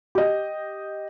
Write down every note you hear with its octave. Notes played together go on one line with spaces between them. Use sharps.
G4 D#5